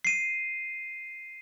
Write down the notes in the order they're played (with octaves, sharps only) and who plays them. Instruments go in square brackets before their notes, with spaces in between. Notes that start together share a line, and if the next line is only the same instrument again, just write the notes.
[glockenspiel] C7 D#7